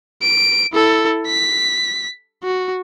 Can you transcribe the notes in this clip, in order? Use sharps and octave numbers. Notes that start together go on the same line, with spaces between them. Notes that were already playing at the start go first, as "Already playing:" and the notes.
D7
E4 A4
B6
F#4